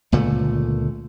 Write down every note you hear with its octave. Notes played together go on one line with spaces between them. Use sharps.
C#2 A#2 D3 A3